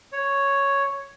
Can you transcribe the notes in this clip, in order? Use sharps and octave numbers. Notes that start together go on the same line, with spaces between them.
C#5